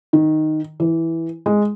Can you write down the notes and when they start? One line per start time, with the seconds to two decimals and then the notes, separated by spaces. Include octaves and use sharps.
0.13 D#3
0.80 E3
1.46 G#3